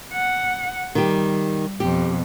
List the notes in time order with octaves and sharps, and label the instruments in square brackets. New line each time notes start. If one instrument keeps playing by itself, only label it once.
[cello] F#5
[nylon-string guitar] D#3 G4 [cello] G3
[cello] F2 B2 [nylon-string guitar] G4